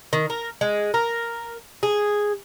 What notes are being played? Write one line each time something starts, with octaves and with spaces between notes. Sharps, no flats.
D#3
A#4
G#3
A#4
G#4